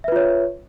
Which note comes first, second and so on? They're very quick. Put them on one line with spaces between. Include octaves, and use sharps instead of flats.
E5 B4 F4 C#5